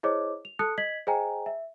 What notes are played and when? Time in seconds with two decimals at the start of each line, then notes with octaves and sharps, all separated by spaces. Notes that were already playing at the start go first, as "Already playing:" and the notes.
0.03 E4 G#4 C5 C#5 D#5 D6
0.45 F7
0.59 A4 A5 D#6 F#6 C#7
0.78 D#5 G#6 B6 F#7
1.07 G#4 C5 D#5 G5 G#5 A#5
1.46 E5